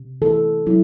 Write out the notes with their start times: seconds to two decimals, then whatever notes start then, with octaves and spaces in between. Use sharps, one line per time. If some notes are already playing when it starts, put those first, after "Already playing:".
Already playing: C3
0.22 E3 A4
0.66 F#3 E4